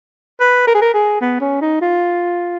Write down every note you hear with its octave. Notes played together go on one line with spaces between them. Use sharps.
B4
A#4
G#4
A#4
G#4
B3
C#4
D#4
F4